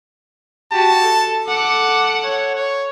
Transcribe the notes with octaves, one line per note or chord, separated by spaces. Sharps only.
F#4 G4 A5
A4
A4 F#5 D6
C#5
C#5